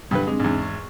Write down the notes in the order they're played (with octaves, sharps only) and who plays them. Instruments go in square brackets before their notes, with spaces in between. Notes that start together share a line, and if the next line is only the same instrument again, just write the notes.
[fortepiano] G2 D3 B4
[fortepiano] G#3 [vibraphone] C4 D4
[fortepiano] E2 G#2
[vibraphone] C#6